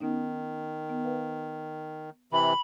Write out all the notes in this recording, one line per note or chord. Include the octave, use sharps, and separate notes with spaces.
D#3 B3 C#4 D#4
B3
B4 F5
C3 E3 B5